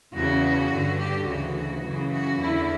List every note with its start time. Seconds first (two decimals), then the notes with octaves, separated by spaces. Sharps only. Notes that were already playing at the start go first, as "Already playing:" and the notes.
0.14 E2 C#3 E3 F#4
0.70 G2 D3
0.99 G4
1.26 D2 C#3 E3 F#4
1.83 F#2 C#3 E3
2.11 F#4
2.39 E2 D3 E4